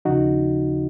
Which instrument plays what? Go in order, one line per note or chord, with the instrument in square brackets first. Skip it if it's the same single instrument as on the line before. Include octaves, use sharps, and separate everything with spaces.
[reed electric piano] D#2 C#3 F3 D#4 F#4